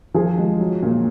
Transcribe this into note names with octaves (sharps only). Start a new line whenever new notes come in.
F3 G#4
G#3
F#3
A#2